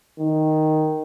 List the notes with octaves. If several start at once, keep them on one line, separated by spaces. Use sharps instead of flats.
D#3